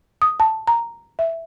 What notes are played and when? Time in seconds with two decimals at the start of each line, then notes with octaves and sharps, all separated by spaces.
0.22 D#6
0.40 A5
0.68 A#5
1.19 E5